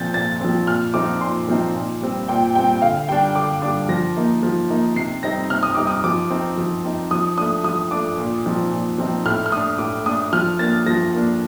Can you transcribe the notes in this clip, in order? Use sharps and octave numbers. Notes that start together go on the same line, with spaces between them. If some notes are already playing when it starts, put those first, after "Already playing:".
Already playing: A#2 F3 C4 G6 A6
A#2 A6
F3 C4
A#2 F6
F3 C4 D#4 D6
A#2 C6
F3 C4 D#4
A#2
G3 C4
A#2 G5
G3 C4 G5
D3 F5
G3 D4 G5
D3 D6
G3 D4 D6
F3 A#6
A#3 D#4
F3
A#3 D#4
C3 C7
G3 C4 D#4 A#6
C3 F6
D#6
G3 C4 D#4 D6
D#6
F3 D6
C4 D#4
F3
C4 D#4
F3 D#6
A3 D4 D#6
F3 D#6
A3 D4 D6
A#2
F3 C4 D#4
A#2
F3 C4 D#4
A2 F6
F6
A3 D4 D#6
A2 D6
A3 D4 D#6
F3 F6
A#3 D4 A6
F3 A#6
A#3 D4